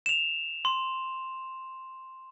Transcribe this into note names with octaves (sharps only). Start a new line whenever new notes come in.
E7 F7
C6